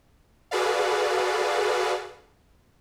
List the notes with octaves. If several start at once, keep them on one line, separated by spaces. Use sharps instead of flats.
F#4 G#4 A4 B4 D5 F5